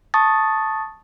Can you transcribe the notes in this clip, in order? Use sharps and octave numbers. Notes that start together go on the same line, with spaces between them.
A5 C#6 D#6 A6